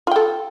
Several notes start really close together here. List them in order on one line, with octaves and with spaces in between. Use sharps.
F4 G5 A4